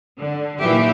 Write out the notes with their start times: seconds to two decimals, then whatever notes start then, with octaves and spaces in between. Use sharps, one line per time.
0.21 D3
0.59 A#2 D#3 E3 F#3 G4 E5